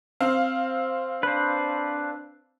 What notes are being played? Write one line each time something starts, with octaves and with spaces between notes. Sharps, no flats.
C4 F5
D4 B4 C5